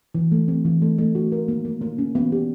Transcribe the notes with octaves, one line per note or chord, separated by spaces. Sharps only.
E3
A3
C4
E3
A3
A3
F#4
A#4
A#3
A#3
A#3
C#4
B3
G4